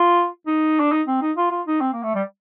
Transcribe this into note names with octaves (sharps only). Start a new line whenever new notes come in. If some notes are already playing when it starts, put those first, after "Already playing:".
Already playing: F4
D#4
D4
D#4
C4
D#4
F4
F4
D#4
C4
A#3
A3
G3